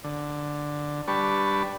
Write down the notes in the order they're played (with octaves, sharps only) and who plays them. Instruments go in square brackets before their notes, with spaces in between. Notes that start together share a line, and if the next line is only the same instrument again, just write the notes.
[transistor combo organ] D3
G3 D4 B4 A5 C#6